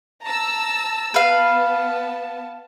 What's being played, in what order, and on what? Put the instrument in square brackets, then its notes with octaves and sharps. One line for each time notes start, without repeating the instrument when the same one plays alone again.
[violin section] A5 A#5 E6
[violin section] B3 A5 [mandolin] B4 F5